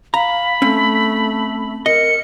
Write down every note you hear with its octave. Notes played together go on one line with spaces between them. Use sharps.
F5 A#5 B5
A3 C4 C#4
A#4 D#5 C#7